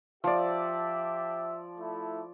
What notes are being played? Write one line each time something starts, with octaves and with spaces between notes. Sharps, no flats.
F3 G4 D5 E5
A3 E4